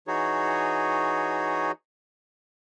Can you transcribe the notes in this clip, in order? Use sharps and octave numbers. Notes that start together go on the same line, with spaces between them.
E3 D#4 F#4 G#4 C#5